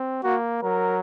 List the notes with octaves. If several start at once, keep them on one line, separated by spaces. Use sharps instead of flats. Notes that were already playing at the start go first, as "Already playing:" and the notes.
Already playing: C4
A#3 F#4
F#3 A#4